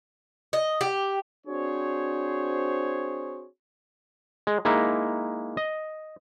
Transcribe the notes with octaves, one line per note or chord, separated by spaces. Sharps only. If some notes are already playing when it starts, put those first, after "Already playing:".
D#5
G4
C4 D4 F#4 G#4 C5 C#5
G#3
G#3 A#3 D#4 E4
D#5